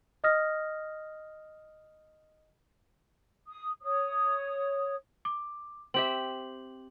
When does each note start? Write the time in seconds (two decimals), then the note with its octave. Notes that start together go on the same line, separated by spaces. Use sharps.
0.24 D#5 D#6 F6 A#6
3.47 D#6
3.83 C#5 D#6
5.25 D6
5.94 C4 G4 E5 F#7